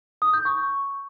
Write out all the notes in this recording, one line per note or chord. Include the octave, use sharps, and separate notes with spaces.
D#6
G6
C#6